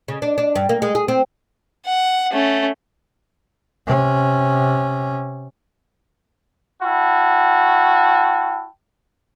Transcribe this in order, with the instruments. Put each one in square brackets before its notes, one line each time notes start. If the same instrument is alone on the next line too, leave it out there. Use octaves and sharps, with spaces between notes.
[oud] C#3
D4
D4
G2
A#3
G#3
G#4
C4
[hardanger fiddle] F#5
A3 C#4
[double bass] C3 C#4
[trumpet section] E4 F#4 G5 A5